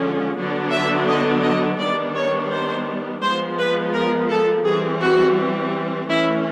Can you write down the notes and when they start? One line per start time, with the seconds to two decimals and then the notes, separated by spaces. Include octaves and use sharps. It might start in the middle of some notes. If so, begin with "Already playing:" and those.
Already playing: D3 F3 G#3 C#4
0.36 D3 F#3 B3 D4
0.72 E5
1.08 D#5
1.43 D#5
1.79 D#3 G3 B3 D4 D5
2.15 C#5
2.50 C5
3.21 F3 G#3 B3 C5
3.58 B4
3.94 A#4
4.29 A4
4.65 E3 G3 C4 G#4
5.00 F#4
6.08 E3 A3 C#4 E4